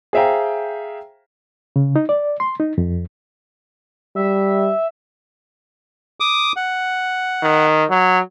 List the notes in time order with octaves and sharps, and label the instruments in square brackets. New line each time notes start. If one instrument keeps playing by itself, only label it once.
[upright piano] G#4 C5 E5 F5 G5 A#5
[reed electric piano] C#3
D#4
D5
C6
D#4
F2
[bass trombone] G3 [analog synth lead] E5
[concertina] D6 D#6
F#5
[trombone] D#3
F#3